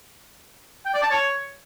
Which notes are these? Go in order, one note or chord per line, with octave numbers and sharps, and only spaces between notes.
G5
D5
A5
C#5